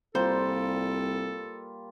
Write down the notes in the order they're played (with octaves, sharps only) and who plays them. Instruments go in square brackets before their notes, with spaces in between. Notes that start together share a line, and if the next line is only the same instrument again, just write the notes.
[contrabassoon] C2 [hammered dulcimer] G3 A#3 F4 [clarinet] A4 [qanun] C5